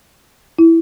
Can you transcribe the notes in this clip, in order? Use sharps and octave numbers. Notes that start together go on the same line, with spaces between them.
E4